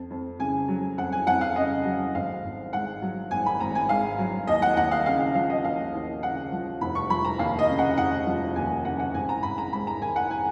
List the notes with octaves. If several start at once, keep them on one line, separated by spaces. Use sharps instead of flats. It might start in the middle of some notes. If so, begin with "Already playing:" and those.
Already playing: F2
F2
C#3 G#5
F#3
F2 F#5
G#5
F2 F#5
F5
C#3 D#5
F#3
G#1 F5
G#1
G#2 F#5
F#3
G#1 G#5
B5
G#1 A#5
G#5
G#2 F5
F#3
D#2 D#5
F#5
D#2 F#5
F5
C#3 F5
F5
F3 F5
D#5
D#2 F5
D#2
C#3 F#5
F3
F1 B5
C#6
F3 B5
A#5
D#2 F5
D#5
C#3
F#5
F1 F#5
F3
D#2 G#5
C#3 F#5
F#5
G#1 G#5
A#5
G#1 B5
A#5
G#2 B5
A#5
D#3 G#5
F#5
G#5